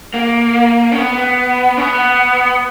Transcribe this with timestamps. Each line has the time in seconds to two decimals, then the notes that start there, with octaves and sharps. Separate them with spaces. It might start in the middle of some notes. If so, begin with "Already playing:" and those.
0.14 A#3
0.92 C#4
0.98 B3
1.18 B3
1.77 C#4
1.81 B3